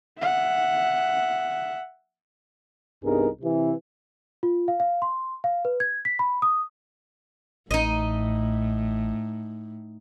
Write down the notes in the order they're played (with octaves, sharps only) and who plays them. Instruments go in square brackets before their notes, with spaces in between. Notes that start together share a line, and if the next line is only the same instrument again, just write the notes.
[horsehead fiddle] E5 F#5
[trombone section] C2 G2 B3 D#4 G#4 A#4
C3 E3
[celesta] F4
F5
F5
C6
F5
B4
G#6
B6
B5
D#6
[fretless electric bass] A1 [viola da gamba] A2 [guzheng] D#4 D#5